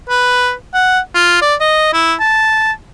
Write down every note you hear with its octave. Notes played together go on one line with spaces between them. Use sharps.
B4
F#5
F4
D5
D#5
E4
A5